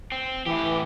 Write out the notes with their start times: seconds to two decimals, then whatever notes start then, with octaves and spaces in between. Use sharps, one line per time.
0.12 C4
0.47 A2 E3 G4